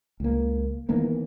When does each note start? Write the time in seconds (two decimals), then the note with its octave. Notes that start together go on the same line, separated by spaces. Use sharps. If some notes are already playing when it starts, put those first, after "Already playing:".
0.20 C#2 A#3
0.89 D#3 E3 A#3 B3